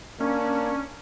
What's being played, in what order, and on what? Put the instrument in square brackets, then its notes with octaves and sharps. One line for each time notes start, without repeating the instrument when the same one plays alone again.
[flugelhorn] A#3 [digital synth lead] C#4 [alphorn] D4